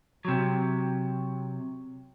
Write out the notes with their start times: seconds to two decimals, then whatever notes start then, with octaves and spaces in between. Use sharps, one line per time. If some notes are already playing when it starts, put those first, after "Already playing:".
0.25 C3 F#3